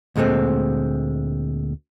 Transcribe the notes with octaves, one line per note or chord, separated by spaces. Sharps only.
D2 A#2 G#3 A3 C4